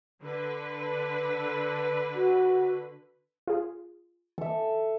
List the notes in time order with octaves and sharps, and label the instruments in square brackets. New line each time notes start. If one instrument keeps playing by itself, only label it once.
[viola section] D3 B4
[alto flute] F#4
[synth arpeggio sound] F4 G#4
[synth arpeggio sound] E3 [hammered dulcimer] A4 E5